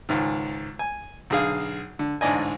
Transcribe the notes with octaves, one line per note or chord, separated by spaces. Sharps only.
C#2 G#2 D#3
G#5
B1 D3 G#4 F5
D3
A1 G#2 D3 D5 D#5 G#5